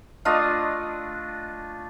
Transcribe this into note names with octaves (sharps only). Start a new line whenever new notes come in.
A3 D4 F4 D#5